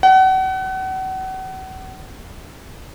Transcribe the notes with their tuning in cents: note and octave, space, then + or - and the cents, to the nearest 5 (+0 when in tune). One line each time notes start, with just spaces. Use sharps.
F#5 +35